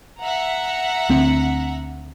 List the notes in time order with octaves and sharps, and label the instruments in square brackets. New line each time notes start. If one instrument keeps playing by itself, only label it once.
[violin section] E5 F#5 A#5
[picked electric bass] D2 C4